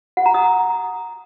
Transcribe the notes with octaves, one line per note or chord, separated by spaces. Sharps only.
F#5
A#5
D#6